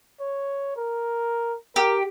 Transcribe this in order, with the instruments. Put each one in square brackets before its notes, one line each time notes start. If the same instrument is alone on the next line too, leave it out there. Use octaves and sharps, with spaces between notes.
[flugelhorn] C#5
A#4
[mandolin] G4 [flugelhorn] A#4